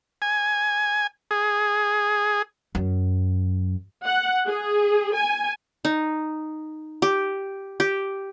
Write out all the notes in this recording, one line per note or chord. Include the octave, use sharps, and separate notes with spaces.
G#5
G#4
F#2
F#5
G#4
G#5
D#4
G4
G4